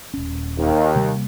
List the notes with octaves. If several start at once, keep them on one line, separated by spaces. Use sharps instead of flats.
D#1 C#4
D#2
C3 G3 A#3